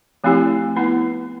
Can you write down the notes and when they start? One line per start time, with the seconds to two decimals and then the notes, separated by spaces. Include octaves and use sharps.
0.24 F3 A3 C4 E4 G4
0.76 B3 E4 B4